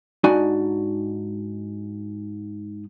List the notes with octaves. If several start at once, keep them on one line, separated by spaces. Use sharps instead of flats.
G#2 D4 D#4 F#4 D5 G#5